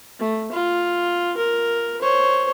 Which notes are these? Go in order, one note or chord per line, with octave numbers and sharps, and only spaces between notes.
A3
F4
A#4
C5 C#5